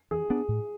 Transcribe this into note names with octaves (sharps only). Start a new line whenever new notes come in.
E3 G#4
B3 D4
A2